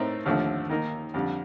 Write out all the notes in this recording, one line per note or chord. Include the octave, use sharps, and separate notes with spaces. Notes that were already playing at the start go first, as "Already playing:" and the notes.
Already playing: A2 A3 C4 D#4 A#4
D#2 D3 F3 A3
D#3 A#3 D#4 A#4
F2 D3 G3